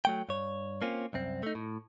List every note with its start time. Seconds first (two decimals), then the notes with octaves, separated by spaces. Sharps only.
0.05 F#3 A3 G5
0.29 G2 C#5
0.82 A#3 C4 C#4 F4
1.13 C2 F#2 C4
1.43 A3 D#4
1.55 A2